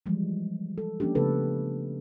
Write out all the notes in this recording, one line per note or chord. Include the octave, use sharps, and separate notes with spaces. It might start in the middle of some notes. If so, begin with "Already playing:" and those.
E3 F3 G3 G#3
A4
F3 A#3 C#4 D4 G4
C#3 F3 A3 B3 A4 B4